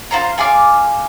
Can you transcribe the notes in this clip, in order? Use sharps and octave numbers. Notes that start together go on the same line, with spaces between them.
F4 C5 A#5
F4 G#4 D6 F6